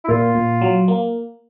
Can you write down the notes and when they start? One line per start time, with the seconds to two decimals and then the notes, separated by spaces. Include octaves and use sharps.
0.04 E4
0.09 A#2 F4
0.35 A#2
0.61 F#3
0.88 A#3